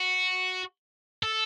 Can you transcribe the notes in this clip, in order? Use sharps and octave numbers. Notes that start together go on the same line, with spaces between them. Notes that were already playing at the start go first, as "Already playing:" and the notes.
Already playing: F#4
A4